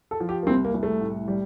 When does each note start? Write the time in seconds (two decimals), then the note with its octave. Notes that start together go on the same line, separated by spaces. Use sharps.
0.11 A4
0.20 F3
0.29 G4
0.43 A#3
0.47 C2 C4
0.64 A#3
0.74 C2
0.83 A3
1.02 A2
1.28 G3